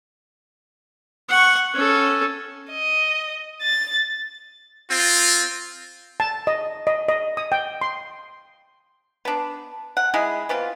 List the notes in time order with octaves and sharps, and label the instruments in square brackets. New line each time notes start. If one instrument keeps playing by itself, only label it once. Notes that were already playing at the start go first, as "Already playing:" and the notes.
[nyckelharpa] F#5 C#6
C#4 A4
[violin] D#5
A6
[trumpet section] C4 F4
[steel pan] A5
D#5
D#5
D#5
D#6
G5
C6
[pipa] B3 D4
F#5
G#3 E4 G#4
E3 B3 C4 F4